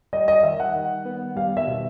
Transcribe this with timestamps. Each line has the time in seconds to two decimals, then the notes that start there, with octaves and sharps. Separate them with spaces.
0.13 G3 D#5
0.28 D#5
0.43 D#3 E5
0.60 F#5
0.75 D#3
1.05 B3
1.36 G3 F5
1.57 E5
1.67 B2